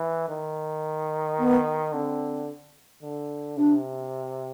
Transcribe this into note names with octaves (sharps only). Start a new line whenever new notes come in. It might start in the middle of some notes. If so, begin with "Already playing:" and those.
Already playing: E3
D#3
B3
D3 C4
D3
C3 D4